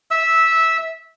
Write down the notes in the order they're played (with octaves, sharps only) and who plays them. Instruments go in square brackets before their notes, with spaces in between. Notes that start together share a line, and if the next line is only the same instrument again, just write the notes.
[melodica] E5 E6